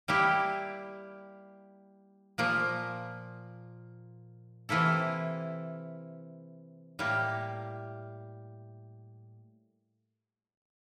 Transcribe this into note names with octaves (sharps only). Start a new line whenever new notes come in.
G3 A#3 E4 G4
A#2 F3 A#3
C3 E3 A#3 E4 A4
A2 G3 A#3